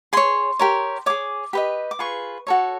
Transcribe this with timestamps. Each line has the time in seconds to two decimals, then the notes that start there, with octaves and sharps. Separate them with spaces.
0.13 G#4 C#5 C6
0.59 G4 A#4 C#5
1.06 G#4 C#5 D6
1.53 G4 B4 D#5
1.91 D6
1.99 F4 G#4 B4 C#6
2.47 F#4 A4 C#5